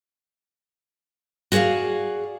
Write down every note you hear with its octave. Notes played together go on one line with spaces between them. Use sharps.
F#4 G#4 C#5 D5 F5